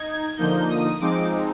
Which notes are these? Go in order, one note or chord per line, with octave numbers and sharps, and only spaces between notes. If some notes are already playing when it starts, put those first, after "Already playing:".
Already playing: D#4 G#6
D3 F3 A#3 D#4 G6
D#6
F3 G#3 C4 D#4 D6